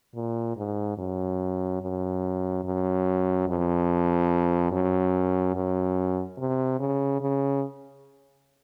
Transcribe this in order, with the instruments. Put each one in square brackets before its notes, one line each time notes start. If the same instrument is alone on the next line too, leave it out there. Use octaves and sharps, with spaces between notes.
[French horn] A#2
G#2
F#2
F#2
F#2
F2
F#2
F#2
C3
C#3
C#3